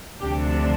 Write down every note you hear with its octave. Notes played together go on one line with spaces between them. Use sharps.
D2 C3 F3 D4 G4